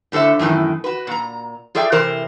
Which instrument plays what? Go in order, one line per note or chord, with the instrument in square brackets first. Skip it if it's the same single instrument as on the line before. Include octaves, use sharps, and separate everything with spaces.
[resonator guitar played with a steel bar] A2 D3 A4 C5 E5
F#2 A2 D#3 E3
F#4 B4
A#2 A#5
F4 G#4 A4 D5 E5 G5
C3 E3 A#4 C5